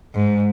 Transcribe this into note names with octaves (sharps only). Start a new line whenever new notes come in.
G#2